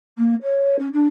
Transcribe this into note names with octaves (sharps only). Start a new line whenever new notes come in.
A#3
C#5
C#4
D4